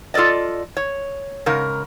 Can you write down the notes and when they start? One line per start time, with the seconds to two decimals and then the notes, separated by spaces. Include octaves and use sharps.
0.14 F4 A4 A#4 D5 D#5
0.77 C#5
1.46 G#2 C#3 A#4